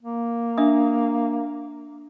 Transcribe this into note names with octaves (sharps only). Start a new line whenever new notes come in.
A#3
D4 E5 D#6